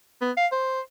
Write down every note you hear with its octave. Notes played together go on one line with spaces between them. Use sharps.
B3
F5
C5